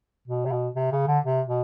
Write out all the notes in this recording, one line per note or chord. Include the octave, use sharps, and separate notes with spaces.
B2
C3
B2
C3
C#3
D3
C3
B2